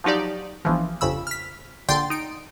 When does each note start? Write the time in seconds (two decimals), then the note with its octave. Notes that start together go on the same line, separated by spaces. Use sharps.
0.04 F3 F#3 D#4 G4 D5
0.65 G1 E3 F3
1.01 G1 F2 C#3 B5 E6
1.27 F6 B6
1.89 A#1 D3 G5 C6 G6 A6
2.10 D#4 D7